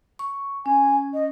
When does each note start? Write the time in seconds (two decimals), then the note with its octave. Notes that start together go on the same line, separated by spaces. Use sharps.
0.19 C#6
0.66 C#4 G#5
1.14 D#5